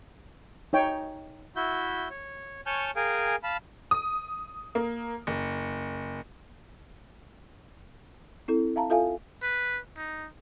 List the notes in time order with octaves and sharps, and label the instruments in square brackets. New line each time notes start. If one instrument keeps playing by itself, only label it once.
[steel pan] D#4 C#5 G5
[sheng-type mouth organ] E4 F#4 E5 G6
C#5
C#5 G#5 A5 C#6 F6 G6
G#4 A#4 F5 G5 G#5
F5 A5 B5
[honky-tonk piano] D#6
A#3
F#1
[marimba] C4 E4 A4
E5 F5 A5 A#5
F4 A4 E5 F5 G#5
[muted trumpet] B4
D#4